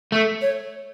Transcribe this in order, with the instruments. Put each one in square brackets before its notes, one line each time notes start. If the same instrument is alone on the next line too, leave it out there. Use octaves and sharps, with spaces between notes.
[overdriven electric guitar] A3
[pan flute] C#5